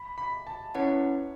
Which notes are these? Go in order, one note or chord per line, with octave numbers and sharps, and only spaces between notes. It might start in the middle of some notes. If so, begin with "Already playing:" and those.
Already playing: B5
B5
A5
C#4 E4 B4 C#5 F#5 A5